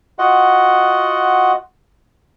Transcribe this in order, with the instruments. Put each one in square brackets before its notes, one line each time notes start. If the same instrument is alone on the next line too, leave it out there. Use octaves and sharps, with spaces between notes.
[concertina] F4 F#4 D#5 F#5